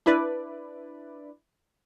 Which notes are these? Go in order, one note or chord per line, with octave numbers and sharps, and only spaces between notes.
D4 E4 B4 D5